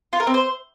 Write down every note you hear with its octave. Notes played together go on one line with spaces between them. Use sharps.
F4
A#4
C4
C5